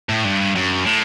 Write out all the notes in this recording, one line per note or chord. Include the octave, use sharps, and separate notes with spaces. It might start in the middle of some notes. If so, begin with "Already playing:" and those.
A2
G2
F#2
A2